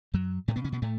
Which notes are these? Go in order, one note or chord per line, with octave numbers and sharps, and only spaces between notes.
F#2 F#3
A2 A3
B2 B3
C#3 C#4
B2 B3
A2 A3